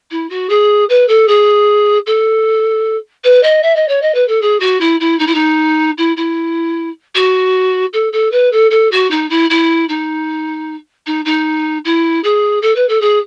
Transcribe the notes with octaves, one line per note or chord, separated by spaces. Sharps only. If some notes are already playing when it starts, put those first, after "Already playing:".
E4
F#4
G#4
B4
A4
G#4
A4
B4
D#5
E5
D#5
C#5
D#5
B4
A4
G#4
F#4
E4
E4
D#4
E4
D#4
E4
E4
F#4
A4
A4
B4
A4
A4
F#4
D#4
E4
E4
D#4
D#4
D#4
E4
G#4
A4
B4
A4
G#4